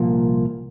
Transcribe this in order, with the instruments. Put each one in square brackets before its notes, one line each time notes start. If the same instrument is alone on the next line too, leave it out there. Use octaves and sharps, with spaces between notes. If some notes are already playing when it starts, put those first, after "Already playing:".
Already playing: [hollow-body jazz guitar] C2 A#2 F3 A#3